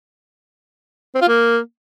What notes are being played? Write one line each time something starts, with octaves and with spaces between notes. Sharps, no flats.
C4
F4
A#3